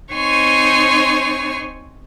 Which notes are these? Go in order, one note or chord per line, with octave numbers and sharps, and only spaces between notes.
C4 D#4 C5 C#5 G#5 C#6